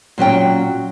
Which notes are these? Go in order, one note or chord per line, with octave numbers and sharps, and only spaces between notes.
A#2 F#3 C#4 G5